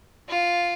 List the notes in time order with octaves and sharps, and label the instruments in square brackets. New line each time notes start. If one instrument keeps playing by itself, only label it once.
[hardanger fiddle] F4